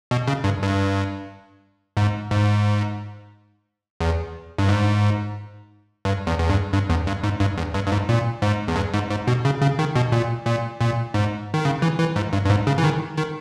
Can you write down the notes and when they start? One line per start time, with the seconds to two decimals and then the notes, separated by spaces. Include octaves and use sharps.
0.11 B2
0.27 C#3
0.44 G2
0.62 G2
1.97 G#2
2.31 G#2
4.00 E2
4.59 G2
4.69 G#2
6.05 G2
6.27 E2
6.40 E2
6.50 G2
6.73 G2
6.90 E2
7.07 G2
7.23 G#2
7.40 G2
7.57 E2
7.74 G2
7.86 G2
7.92 G#2
8.09 A#2
8.42 G#2
8.68 E2
8.76 G2
8.94 G#2
9.10 G#2
9.27 B2
9.45 C#3
9.62 C#3
9.79 D#3
9.96 B2
10.12 A#2
10.46 A#2
10.81 A#2
11.14 G#2
11.54 D#3
11.65 C#3
11.82 E3
12.00 E3
12.16 G#2
12.33 G2
12.46 G2
12.50 G#2
12.67 C#3
12.78 E3
12.84 D#3
13.17 D#3